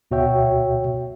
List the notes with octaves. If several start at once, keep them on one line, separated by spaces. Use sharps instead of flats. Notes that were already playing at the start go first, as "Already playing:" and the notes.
D2 B2 F#4 C#5 E5 G5